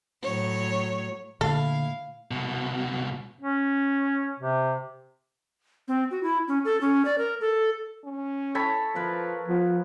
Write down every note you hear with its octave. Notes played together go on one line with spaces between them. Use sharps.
A2 F#3 C#5
A#2 D3 A3 E4 A4 F5
C2 B2
C#4
C3
C4
F#4
E4
C#4
A4
C#4
D5
A#4
A4
C#4
A4 C#5 B5
F3 A#4 B4
F3 B3